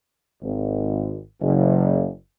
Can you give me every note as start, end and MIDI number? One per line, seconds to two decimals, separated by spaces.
0.42 1.16 32
1.41 2.08 30